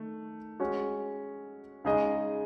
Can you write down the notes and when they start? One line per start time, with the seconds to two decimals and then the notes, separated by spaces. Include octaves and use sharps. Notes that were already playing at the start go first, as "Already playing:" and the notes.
Already playing: D#3 A3
0.60 G#3 C#4 F#4
1.85 C#3 G#3 D#4 G#4 D#5